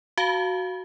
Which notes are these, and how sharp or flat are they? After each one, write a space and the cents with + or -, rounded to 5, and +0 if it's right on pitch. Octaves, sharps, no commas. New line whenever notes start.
F#4 +0 F5 +0 A5 +35